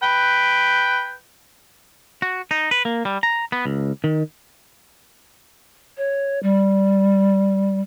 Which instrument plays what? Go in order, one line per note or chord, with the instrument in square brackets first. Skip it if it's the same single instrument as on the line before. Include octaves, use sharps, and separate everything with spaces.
[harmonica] B4 G5
[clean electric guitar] F#4
D#4
B4
A#3
G3
A#5
B3
C#2
D#3
[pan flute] C#5
G3